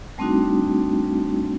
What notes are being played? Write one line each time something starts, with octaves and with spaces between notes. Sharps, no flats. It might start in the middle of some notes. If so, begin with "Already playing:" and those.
G3 A3 C4 D4 D#4 F#4